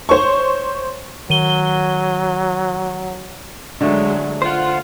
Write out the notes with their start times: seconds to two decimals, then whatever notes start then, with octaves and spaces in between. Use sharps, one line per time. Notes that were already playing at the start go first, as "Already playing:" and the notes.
0.09 C5 C#5 C#6
1.30 D#3 F#3 D#7 G7
3.81 D3 F#3 G#3 A3
4.42 F4 C5 F#5